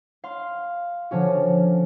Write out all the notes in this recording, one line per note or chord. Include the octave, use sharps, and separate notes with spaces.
F5 C6
D3 F3 C#4 F#4